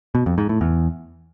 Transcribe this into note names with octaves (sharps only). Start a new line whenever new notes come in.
B2
F2
G#2
A2
E2